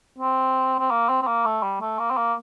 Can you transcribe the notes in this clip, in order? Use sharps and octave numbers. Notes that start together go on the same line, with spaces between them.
C4
C4
A#3
C4
C4
A#3
A3
G3
A3
A#3
C4
A#3